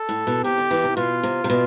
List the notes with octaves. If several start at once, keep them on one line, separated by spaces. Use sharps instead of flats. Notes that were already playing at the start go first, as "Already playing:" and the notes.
Already playing: A4
A2
B2
C3 G4
D3
E3
C3
B2 F4
C3
C3
B2